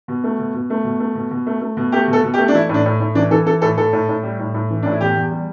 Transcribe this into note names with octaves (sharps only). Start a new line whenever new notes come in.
B2
A3
B2
B2
A3
B2
A3
B2
B2
A3
A3
B2
A3 G4
B2 A4
B2
G4
A3
D4
E3 E4
A2 D4
A2
A2
E3 D4
E3 A4
E3 A4
A2 A4
A2 A4
A2
A2
G3
A2
A2
E3
A2 D4
E4
E2 G4
E2
G3